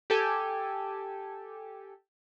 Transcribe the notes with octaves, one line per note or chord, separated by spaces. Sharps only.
G4 A4 G#5